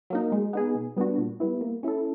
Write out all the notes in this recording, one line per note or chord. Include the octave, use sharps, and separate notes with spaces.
F#3 A#3 D#4
G#3
B3 D#4 G#4
B2
G3 B3 D4 F#4
A#2
G3 B3 E4
A#3
C#4 E4 A4